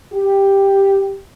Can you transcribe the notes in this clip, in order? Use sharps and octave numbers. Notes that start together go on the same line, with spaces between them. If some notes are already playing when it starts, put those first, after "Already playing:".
G4